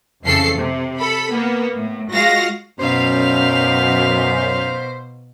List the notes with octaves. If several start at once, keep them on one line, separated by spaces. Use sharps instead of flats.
F2 C#3 E3 A4 C7
C3
A4 B5
A#3 B3
A2
G#3 F4 F#4 F5 A#6
F#2 B2 D#4 C5 F5